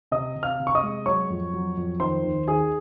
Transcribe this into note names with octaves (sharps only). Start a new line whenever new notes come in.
C3 D#5 D#6
C3
F5 F6
C3
C#6
D#5 D#6
G#3
F#3 C#5 C#6
F2
F#3
F2
D#3 C5 C6
D#2
D#3 G#4 G#5